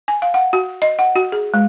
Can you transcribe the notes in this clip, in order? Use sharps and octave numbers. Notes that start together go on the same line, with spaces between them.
G#5
F5
F#5
F#4
D#5
F#5
F#4
G#4
G#3